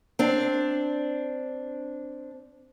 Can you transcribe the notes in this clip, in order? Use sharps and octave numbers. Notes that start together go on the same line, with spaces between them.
C4 D4